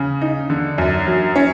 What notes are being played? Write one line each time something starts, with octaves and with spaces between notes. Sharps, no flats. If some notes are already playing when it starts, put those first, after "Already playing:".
Already playing: C#3
D#4
D3
F#2
F#3
C#4